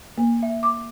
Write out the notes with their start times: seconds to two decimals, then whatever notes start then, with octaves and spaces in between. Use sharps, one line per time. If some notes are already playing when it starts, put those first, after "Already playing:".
0.18 A#3
0.43 E5
0.63 D6